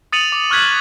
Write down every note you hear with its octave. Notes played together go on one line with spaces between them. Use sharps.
D#6 A6 C#7 D#7 F7 F#7
D6
C#6 F6 F#6 G#6 B6 F#7